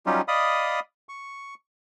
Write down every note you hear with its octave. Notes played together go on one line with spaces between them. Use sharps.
F#3 G3 C#4 D#4 F4 G4
D5 D#5 F5 B5 D#6
C#6